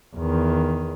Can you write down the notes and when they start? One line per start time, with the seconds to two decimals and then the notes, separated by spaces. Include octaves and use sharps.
0.16 E2 D#3